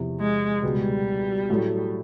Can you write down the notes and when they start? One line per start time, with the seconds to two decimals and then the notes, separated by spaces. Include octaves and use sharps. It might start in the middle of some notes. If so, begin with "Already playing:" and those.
Already playing: E2 C3 F3
0.20 G#3
0.63 C#2 B2 G3 G#3 B3
1.50 A2 F#3 A3